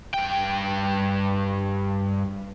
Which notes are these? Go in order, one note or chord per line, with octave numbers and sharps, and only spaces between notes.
G2 G5